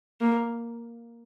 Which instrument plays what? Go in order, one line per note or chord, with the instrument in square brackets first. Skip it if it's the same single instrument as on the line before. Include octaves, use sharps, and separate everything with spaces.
[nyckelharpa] A#3